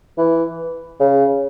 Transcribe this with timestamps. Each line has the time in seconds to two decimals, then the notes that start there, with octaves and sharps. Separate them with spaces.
0.18 E3
1.00 C#3